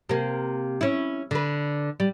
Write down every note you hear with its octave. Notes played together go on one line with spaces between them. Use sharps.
C3 A#3
C#4 E4
D3 B4
G3